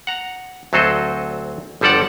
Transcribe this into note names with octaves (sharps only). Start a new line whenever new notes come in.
F#5 A#5
D2 F#3 C4 A4 C5 D#5
G1 F3 G3 A4 D5 F#5